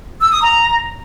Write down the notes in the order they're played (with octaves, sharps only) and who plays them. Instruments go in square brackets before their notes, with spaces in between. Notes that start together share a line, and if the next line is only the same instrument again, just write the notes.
[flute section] E6
D#6
A#5